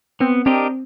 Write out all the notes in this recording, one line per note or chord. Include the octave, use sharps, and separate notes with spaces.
B3 C4
C4 D4 G4 A#4 D#5